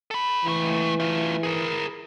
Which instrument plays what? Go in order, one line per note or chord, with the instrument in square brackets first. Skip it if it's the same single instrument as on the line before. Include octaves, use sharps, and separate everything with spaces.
[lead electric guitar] A4 B5
[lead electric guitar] C#2 A3 [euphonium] E3
[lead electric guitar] A3 F4
G#4 A#4